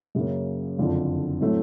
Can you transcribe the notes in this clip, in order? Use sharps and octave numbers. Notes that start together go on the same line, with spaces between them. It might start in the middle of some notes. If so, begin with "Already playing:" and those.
F#2 C#3 F#3 A#3
F#1 F2 D3 F3
A2 F#3 A3 C4